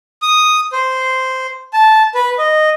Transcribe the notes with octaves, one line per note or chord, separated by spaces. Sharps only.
D#6
C5
A5
B4
D#5